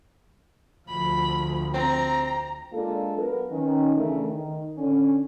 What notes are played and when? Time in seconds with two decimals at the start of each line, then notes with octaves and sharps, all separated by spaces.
0.89 D2 F3 B5
1.74 C4 A#5
2.72 G#3 A#3 D4 F4 A4
3.16 F#3 B3 A#4 B4
3.51 D#3 C#4
3.95 C#3 E3 A3 D4 A#4
4.26 D#3
4.78 D3 C#4